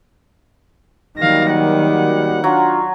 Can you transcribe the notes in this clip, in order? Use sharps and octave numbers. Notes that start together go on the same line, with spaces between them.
D#3 F#3 G3 A#3 F5 A#6
F#5
F#3 D4 F4